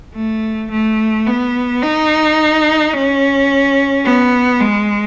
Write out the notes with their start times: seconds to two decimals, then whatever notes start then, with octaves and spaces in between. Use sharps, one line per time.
0.15 A3
0.71 A3
1.27 B3
1.82 D#4
2.93 C#4
4.05 B3
4.60 G#3